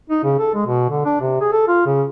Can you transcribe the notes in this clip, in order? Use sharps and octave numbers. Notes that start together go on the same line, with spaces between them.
D#4
C#3
A4
G#3
B2
D3
D4
C3
G#4
A4
F4
C#3